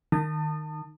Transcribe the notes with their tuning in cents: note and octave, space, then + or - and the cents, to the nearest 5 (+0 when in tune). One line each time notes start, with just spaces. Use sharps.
D#3 -15 A5 +25 D#6 -25